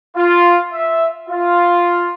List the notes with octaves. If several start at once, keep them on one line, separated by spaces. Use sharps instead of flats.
F4
E5
F4